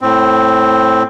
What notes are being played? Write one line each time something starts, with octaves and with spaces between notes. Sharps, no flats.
A2 C4